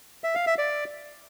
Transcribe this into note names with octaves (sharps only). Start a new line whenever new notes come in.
E5
F5
E5
D5